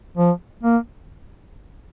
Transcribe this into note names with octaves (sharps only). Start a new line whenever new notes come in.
F3
A#3